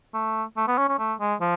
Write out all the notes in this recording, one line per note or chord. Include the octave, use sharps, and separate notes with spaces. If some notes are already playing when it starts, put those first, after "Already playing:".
A3
A3
B3
C#4
C#4
A3
G#3
F3